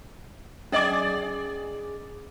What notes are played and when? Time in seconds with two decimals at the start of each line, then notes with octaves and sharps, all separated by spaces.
0.72 C#4 G#4 D5 D#5 D6